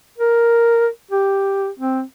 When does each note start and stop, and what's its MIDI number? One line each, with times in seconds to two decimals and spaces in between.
0.18 0.88 70
1.11 1.69 67
1.79 2.02 60